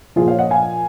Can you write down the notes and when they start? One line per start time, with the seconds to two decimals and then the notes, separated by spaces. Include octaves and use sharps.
0.16 A#2 F3 F4 G#4
0.28 C#5 F5
0.39 D#5 F#5
0.51 F5 G#5